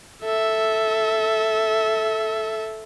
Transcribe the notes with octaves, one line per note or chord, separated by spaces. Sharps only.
A4 E5